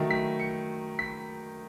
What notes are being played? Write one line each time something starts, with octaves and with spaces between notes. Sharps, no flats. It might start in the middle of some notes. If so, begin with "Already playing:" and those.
Already playing: D#3 F#3 A3
B6
C#7
B6